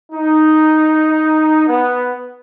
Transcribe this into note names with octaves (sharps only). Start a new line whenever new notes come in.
D#4
B3